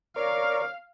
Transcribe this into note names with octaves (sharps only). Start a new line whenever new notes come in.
A#4 C#5 D5 F5